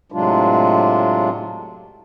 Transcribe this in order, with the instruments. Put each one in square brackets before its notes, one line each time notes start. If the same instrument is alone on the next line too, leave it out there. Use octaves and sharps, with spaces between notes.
[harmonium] A2 C3 F#3 G#3 D4 F4